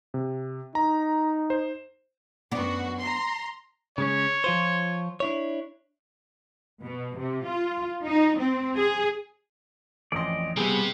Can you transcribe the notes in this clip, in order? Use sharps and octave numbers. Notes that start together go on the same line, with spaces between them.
C3
D#4 A#5
C5
F#2 B3 D4 F#4
A#5 C6
C#3 G#3 C#4 C#5
F3 F4 C5
D4 E4 C#5
B2
C3
F4
D#4
C4
G#4
A1 F2 D5 D#5 C6
C3 G3 B3 C4 G#4